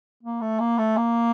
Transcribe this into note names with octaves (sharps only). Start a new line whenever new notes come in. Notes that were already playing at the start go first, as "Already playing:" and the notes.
A#3
A3
A#3
A3
A#3